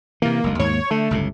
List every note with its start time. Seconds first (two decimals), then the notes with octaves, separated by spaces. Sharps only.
0.22 C3 E3 A#3
0.44 F#1 D2 G#3
0.60 D#2 G#2 A#3 C#5
0.91 D3 A3
1.11 G1 C#2 A2